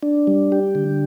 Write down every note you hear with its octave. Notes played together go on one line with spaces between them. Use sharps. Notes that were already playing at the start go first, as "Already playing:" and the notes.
D4
G3
G4
D3